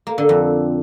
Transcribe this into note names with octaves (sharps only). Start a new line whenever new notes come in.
A#3
D3
F2